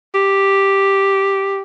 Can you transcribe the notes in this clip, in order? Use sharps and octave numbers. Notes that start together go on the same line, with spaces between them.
G4